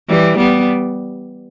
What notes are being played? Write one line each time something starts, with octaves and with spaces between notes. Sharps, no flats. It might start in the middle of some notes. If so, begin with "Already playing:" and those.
E3 G3
G3 B3